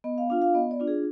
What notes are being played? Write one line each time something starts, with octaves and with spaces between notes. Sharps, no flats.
B3 D#5
F5
D4 F4 F5
F5
B3 D#5
D5
D4 F4
G#4